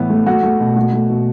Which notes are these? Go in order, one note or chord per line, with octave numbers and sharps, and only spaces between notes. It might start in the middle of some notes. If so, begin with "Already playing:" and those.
Already playing: A2 E3 B3
A3
A3 F#4
A3
B2
A3 F#4
A3
B2